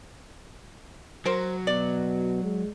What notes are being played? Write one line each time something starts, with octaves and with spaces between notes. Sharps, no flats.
F#3 A#4 C5
B2 D5
G#3